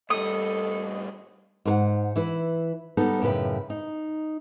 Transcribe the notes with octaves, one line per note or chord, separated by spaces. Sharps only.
A2 G3 A4 D#5 D#6
G#2 A#4 F#5
E3 E4 B4
G3 B3 D#4 A4
F#2 A2 C#3 B4 G5
D#4